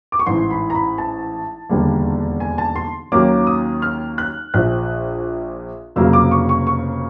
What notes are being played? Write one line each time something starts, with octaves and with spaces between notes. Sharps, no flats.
D6
C#6
A1 G#2 E3 C6
B5
A#5
B5
A5
E1 D#2 D3 G3 A#3
G#5
A5
C6
D#2 D#3 F#3 A#3 C#4 D6
D#6
F6
F#6
A#1 A#2 F3 F#6
F1 F2 C#3 F#3 A#3 E6
D6
C#6
C#6
C#6